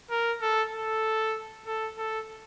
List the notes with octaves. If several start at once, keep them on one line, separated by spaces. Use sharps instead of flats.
A#4
A4
A4
A4
A4